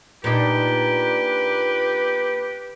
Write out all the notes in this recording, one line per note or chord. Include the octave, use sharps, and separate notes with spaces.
A#2 D4 D#4 G4 B4